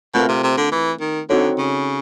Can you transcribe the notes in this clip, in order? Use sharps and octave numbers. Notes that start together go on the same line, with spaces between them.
B2 A3 C4 F4 A#4
C3
C3
D3
E3
D#3
D3 C4 D#4 F#4 A4 C#5
C#3